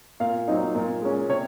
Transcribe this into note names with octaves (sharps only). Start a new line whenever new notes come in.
A#2 F5
F#3 C4 D#4
A#2
G#3 C#4
C3 C#5